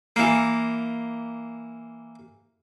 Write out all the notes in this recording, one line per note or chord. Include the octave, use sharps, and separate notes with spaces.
E3 A#3